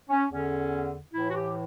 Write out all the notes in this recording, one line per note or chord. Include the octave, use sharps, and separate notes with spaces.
C#4
E2 D3 C#4
A2 E3 E4
F#4
G4